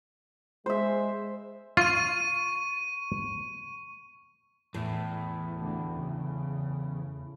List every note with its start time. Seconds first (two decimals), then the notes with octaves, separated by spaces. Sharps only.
0.66 G#3 C5 E5
1.77 F4 C#6 D#7
4.74 E2 A2
5.56 D2 D3
5.97 C#3